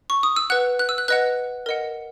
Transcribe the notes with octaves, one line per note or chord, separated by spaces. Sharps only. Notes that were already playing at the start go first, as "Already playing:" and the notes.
C#6
D#6
E6
B4 F#5 F#6
F#6
E6
F#6
B4 D#5 F#5 F#6
A#4 D#5 F#5